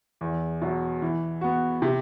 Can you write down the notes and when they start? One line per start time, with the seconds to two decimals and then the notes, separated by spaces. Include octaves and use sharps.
0.21 E2
0.62 B2 F#3
1.02 E3
1.41 B3 F#4
1.82 C3